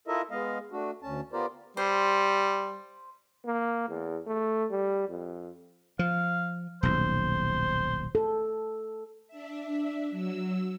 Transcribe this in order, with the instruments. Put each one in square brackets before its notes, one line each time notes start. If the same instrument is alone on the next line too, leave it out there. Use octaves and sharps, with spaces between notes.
[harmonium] E4 F4 A4 A#4 D#5 E5
G#3 B3 D#5 F5
A3 D4 F#4
D2 C#4 A5
B3 F4 G4 A#4 C5 D5
[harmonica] G3 [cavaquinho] C5
[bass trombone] A#3
E2
A3
G3
F2
[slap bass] F3 [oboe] F5
[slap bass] D#1 B1 [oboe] C5
[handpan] A4
[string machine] D4 E5
F#3 E6